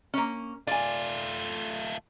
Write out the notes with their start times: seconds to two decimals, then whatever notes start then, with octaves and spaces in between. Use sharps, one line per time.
0.14 A#3 C#4
0.67 A3 F4 D5 G#5